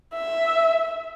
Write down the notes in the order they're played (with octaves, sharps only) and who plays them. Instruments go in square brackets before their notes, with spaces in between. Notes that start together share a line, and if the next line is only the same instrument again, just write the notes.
[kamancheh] E5